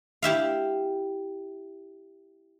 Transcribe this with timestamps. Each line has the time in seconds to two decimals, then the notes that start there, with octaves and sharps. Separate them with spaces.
0.22 E4 G4 E5 F5